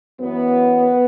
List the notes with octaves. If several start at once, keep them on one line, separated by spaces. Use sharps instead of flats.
F#2 E3 B3